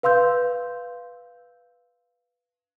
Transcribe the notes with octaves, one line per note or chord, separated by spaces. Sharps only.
B4 F5 C6 E6 G6